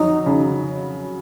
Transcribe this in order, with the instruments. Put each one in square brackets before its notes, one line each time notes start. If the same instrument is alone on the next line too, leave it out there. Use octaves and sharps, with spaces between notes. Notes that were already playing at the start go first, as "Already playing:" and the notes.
Already playing: [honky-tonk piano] F2 F#3 [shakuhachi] D#4
[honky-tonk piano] C#3